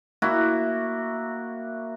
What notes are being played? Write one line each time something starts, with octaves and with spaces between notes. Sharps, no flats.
A#3 E4 F#4